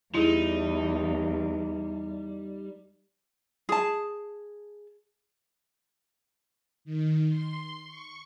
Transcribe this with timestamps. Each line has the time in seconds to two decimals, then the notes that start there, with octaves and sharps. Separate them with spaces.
0.14 E2 G3 D#4 E4 G#4
3.69 G#4 A5
6.85 D#3
7.28 C6
7.86 C#6